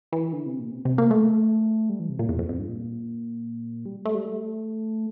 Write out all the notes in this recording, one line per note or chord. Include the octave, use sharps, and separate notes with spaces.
E3
D3
C3
A#2
C3
C3
A#3
A3
G3
E3
C3
A#2
E2
F2
F2
G2
A#2
G3
A3
G3
A3